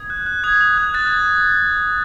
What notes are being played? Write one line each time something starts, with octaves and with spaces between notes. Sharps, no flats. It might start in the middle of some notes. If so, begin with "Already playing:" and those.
Already playing: D#6 G#6
F#6
F#6
D#6 G#6
D#6
F#6
F#6 A6